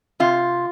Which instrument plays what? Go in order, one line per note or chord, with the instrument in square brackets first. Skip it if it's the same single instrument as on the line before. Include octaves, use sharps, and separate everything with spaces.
[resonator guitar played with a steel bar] C3 F4